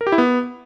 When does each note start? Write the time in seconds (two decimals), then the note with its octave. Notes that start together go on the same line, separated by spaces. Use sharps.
0.01 A#4
0.07 G4
0.12 E4
0.18 B3